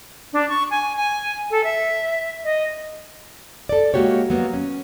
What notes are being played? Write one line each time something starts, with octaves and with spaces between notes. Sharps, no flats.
D4
C#6
G#5
G#5
A4
E5
D#5
A4 D5
G#3 A#3 F#4 G4 C#5
F#3 A#3 B3
C#4